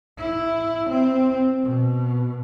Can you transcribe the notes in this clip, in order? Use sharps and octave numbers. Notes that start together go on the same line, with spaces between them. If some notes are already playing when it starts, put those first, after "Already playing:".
E4
C4
B2